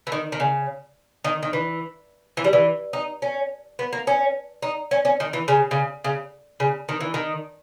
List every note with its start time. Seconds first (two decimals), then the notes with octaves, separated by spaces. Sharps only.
0.07 E3
0.12 D#3
0.32 D#3
0.40 C#3
1.24 D#3
1.43 D#3
1.53 E3
2.37 E3
2.44 G3
2.53 E3
2.93 D#4
3.22 C#4
3.79 B3
3.93 A#3
4.07 C#4
4.62 D#4
4.91 C#4
5.05 C#4
5.20 D#3
5.33 E3
5.48 C#3
5.71 C#3
6.04 C#3
6.60 C#3
6.89 D#3
7.01 E3
7.14 D#3